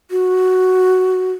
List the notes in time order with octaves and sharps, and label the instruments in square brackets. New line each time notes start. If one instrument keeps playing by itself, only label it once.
[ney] F#4